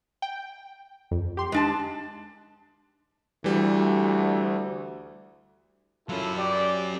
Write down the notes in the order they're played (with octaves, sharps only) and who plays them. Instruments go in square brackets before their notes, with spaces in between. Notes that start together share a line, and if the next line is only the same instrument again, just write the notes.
[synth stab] G5
F2
G4 C6
[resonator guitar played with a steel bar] G#3 D4 A5
[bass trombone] D2 [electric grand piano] E3 G3
[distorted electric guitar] F#3 C#4 [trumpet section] E4 F4 A4
[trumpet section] G4 D5